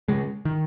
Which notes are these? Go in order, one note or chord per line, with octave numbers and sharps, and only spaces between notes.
C#3 G#3
D#3